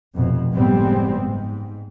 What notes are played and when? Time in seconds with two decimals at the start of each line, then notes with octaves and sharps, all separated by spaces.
0.14 F1 F2 B2
0.52 F#1 A2 G3 G#3 B3 C4
1.17 G#2